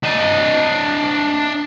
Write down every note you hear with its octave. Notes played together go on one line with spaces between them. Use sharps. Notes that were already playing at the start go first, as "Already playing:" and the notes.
D4 D#5